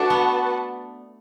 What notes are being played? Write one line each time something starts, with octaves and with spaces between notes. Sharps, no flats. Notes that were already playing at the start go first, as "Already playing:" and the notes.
Already playing: A3 D4 F#4 B4 F#5 A5
B3